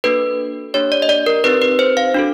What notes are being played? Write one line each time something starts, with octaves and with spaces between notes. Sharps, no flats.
A#3 D4 F#4 A4 B4
A#3 D4 G4 C#5
D5
D#5
D5
A#4
C4 D#4 G4 B4
B4
C5
F5
D4 F#4 A4